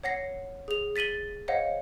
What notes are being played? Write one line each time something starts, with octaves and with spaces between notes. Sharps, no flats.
C#5 F#5 A#6 C7
G#4 F7
A6 B6 D#7 F#7 G7
C5 C#5 D#5 F5 F#5